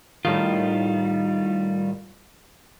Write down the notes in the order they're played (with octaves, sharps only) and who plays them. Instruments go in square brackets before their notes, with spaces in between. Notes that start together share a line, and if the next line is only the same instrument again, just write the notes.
[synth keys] A2 D#3 [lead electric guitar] G3 F4